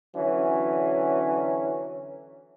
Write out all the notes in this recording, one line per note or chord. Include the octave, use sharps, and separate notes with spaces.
D3 E3 F#3 C#4